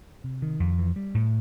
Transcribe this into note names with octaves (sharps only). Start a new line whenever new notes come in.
C3
D#3
F2
E3
G3
A2